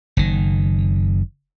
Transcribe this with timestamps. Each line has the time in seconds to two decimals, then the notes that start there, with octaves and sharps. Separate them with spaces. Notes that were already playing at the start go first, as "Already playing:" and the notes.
0.17 F#1 D#3